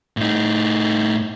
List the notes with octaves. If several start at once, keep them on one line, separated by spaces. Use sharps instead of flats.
A2 D#4